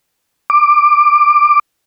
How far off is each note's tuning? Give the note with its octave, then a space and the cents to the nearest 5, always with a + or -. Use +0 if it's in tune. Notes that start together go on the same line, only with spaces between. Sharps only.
D6 +15